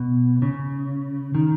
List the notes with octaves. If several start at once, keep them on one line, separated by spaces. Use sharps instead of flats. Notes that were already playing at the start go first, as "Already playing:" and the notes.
Already playing: B2
C#3
D#3